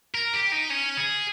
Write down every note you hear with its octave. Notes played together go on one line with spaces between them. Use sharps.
A#4
G4
D#4
C#4
G#4